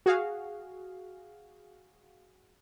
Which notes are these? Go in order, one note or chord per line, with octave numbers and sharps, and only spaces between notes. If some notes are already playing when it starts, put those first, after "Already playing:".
F#4 G#4 F5